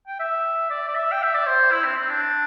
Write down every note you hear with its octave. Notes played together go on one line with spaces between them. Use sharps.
G5
E5
D5
D5
E5
G5
E5
D5
C5
E4
C4
C4
D4